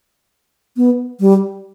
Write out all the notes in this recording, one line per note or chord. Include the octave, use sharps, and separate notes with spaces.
B3
G3